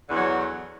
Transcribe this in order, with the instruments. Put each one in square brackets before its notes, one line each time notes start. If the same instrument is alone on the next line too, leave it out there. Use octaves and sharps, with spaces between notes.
[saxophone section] D3
E2
F#3